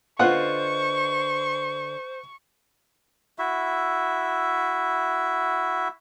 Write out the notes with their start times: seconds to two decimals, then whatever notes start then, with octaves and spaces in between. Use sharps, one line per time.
0.19 D3 F4 B4 C5 D#5 F#5 C#6
3.39 E4 F#4 E5